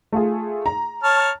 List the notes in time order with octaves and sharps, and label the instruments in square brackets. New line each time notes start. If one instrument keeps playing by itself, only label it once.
[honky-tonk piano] A3 F4 G#4
A#5
[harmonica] C#5 A5 F6